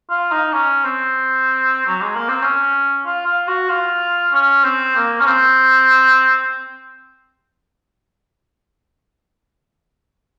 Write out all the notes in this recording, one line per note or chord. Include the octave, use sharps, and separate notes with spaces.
F4
D#4
C#4
C4
F#3
G#3
A#3
C4
C#4
F4
F4
F#4
F4
C#4
C4
A#3
C#4
C4